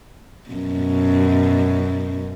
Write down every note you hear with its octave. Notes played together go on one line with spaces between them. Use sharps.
F#2 B2